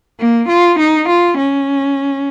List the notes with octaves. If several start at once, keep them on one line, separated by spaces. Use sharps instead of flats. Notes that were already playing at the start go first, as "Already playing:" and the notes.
A#3
F4
D#4
F4
C#4